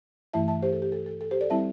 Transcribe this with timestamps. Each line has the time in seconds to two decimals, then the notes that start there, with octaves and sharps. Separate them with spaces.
0.33 G2 E3 A3 E4 E5 A5
0.48 E5 A5
0.63 G4 C5
0.73 A4
0.82 G4
0.92 A4
1.06 A4
1.21 A4
1.31 G4 C5
1.41 A4 D5
1.50 G3 C4 E4 E5 A5